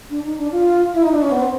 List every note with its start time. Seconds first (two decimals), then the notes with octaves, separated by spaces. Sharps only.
0.09 D4
0.23 D#4
0.37 D4
0.51 F4
0.93 E4
1.02 D#4
1.12 D4
1.21 C#4
1.31 B3
1.39 C4